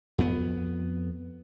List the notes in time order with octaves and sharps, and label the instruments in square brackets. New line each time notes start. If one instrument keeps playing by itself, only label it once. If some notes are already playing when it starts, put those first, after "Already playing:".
[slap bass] F2 B3